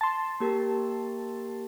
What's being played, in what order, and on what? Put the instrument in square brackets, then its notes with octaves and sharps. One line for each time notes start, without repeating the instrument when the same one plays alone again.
[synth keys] A5 C6
[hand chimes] A#3 G4 A#4